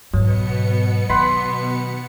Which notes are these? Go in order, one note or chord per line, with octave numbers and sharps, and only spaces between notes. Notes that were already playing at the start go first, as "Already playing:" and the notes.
G#2 B2 F#3 B3 C#7
D#3 F#5 B5 C6